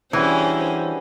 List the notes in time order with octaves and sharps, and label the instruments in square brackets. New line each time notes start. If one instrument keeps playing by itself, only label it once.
[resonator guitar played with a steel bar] E3 [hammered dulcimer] G3 F#4 G#4 [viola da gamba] C#4 D4 C5